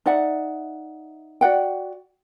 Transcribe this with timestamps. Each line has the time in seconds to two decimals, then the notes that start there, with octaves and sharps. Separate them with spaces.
0.06 D#4 D5 E5 F#5
1.41 F#4 D5 F#5 G5